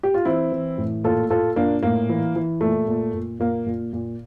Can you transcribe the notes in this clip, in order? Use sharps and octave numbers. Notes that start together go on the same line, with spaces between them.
G4
F4
E3 C4 E4
E3
A2
A#2 F4 A4
A#2 F4 A4
A#2 A#3 D4
A2 A#3
E3
E3
A#2 A3
A#2
A#2
A#2 A#3
A#2
A#2